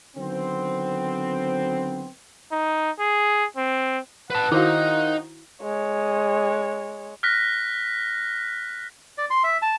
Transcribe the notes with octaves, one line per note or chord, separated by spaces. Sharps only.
D3 D#3 F#3 B3 C4
D#4
G#4
C4
B4 F#5 A5
D#3 D#4 E4 F#4 C5 F5
G#3 C#5
F6 F#6 A#6 B6
D5
C6
E5
A5